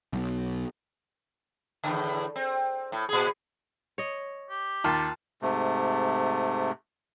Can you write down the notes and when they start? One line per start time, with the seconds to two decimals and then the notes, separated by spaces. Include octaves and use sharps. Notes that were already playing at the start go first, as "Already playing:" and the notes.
0.13 B1
1.84 E2 A2 D3
2.36 C4
2.92 A2
3.09 A#2 G#4
3.98 C#5 D#5
4.50 G4
4.84 D#2 F4 A5 A6
5.42 G#2 C3 A3